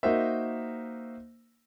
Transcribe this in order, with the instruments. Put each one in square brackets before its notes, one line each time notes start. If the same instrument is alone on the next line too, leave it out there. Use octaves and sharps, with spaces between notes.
[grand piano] A#3 D#4 F#4 A#4 C5 E5